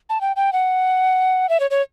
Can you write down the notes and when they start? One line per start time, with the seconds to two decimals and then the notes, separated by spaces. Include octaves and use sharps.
0.10 A5
0.21 G5
0.36 G5
0.53 F#5
1.49 E5
1.60 C#5
1.71 C#5